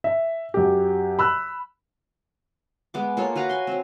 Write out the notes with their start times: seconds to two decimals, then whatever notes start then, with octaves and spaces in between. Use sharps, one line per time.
0.04 E5
0.54 F#2 G4
1.19 B5 E6 F#6
2.94 G#3 B3 D6
3.17 A#3 F4 A4 C#5
3.36 F#4 B4 F5 A#5
3.49 G#5 C6
3.67 F#3 C4